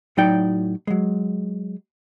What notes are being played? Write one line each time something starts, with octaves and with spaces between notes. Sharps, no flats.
A2 F#3 D#4 F#4 D5 G5
F#3 G#3